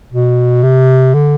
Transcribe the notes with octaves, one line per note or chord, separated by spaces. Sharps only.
B2
C3
D3